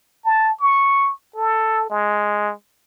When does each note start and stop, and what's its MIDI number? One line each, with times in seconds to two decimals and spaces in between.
0.25 0.52 81
0.60 1.12 85
1.36 1.89 69
1.90 2.53 56